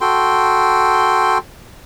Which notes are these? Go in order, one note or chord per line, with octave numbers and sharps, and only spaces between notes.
F#4 A4 G5 C6